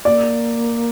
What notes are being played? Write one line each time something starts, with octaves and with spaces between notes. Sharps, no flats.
A#3 D5